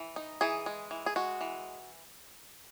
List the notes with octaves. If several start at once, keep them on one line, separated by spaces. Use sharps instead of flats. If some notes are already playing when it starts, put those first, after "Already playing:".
Already playing: E3
D#4
E3 G#4
G#3
E3
G#4
G#3 F#4
E3